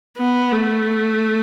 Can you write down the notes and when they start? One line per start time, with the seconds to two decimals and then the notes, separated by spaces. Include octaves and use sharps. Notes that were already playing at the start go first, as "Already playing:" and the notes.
0.17 B3
0.52 A3